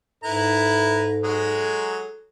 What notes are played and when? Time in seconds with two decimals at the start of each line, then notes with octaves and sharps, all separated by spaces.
0.24 G#2 E4 A4 B4 A#5
1.23 F#3 G#3 G#4